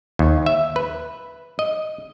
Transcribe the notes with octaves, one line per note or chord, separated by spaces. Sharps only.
D#2
E5
B4
D#5